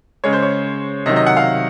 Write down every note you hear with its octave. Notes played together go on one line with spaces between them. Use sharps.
C#3 G#3 C#5
C5
C#5
C3 D#3 F#3 D#5
D#5
F#5
F5